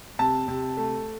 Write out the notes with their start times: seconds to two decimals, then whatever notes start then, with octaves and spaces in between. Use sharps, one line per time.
0.19 C3 A5
0.48 C3
0.77 A3